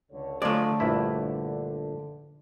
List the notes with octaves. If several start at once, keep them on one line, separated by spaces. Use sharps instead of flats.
C#2 D3 C#5
D3 F3 F#3 G#3 A3 D5
A#1 G2 E4